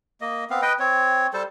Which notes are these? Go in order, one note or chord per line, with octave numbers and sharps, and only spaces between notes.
A#3 D#5
B3 C4 F5
B4 D#5 G5
C4 C#5
G3 A4 C5 A5